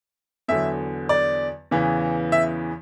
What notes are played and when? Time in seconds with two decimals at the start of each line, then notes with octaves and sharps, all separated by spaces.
0.48 E2 D3 F#3 E5
1.09 D5
1.71 E2 C#3 E3
2.32 E5